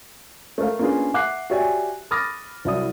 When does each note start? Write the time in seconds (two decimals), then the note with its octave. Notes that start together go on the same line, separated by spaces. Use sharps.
0.58 A3 A4 A#4 F5
0.79 A#3 C#4 D4 F4 G#4 B4
1.14 E5 F#5 D6 F#6 C7
1.50 F#4 G4 C#5 D5 E5 G#5
2.11 B5 D6 D#6 F6 A6 A#6
2.65 C2 F#3 E4 D5 D#6